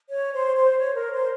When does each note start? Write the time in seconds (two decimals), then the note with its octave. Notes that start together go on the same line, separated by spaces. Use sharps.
0.09 C#5
0.32 C5
0.55 C5
0.78 C#5
0.95 A#4
1.12 C5